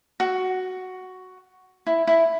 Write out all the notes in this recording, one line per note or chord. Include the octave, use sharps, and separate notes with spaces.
F#4
E4
E4